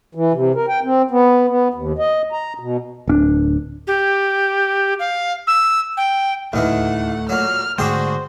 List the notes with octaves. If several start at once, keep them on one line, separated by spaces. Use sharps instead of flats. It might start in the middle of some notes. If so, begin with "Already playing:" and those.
E3
C3
A#4
G5
C4
B3
B3
D#2
D#5
A#5
B2
D1 C#4 D4
G4
F5
E6
G5
D1 D#2 A2 D#3 E3 A3 F#5
A#2 F#3 F6
G#2 D3 A3 D4 F#4 G#4 C5 G5